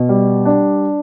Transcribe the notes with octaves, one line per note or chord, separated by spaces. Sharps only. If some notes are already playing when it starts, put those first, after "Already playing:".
Already playing: B2
G3
D4